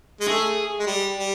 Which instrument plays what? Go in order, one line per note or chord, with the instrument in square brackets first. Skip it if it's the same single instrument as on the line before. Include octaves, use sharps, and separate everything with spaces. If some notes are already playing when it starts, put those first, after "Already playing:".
[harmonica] G#3
[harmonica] A3 [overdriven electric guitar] G#4
[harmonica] G#3
G3
G3